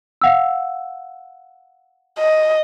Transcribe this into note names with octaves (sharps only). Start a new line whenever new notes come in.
F5 F#5 E6
D#5